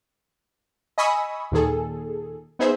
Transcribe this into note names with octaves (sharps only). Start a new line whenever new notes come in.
D#5 G#5 B5 C#6 D#6 E6
D#2 A#2 D#3 G#4 A4
B3 D#4 G#4 C5 E5